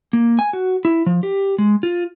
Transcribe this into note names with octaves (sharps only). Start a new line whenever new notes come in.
A#3
G#5
F#4
E4
F3
G4
G#3
F4